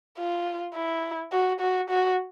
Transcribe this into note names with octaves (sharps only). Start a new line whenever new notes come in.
F4
E4
F#4
F#4
F#4